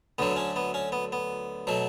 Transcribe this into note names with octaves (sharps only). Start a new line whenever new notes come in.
D2 D3 F#3 A3 B3
C#4
B3
C#4
B3
B3
B2 F#3 A3